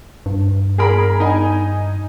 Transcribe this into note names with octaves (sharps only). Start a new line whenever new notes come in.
G2
G#4 A#4 B5
D#4 G#5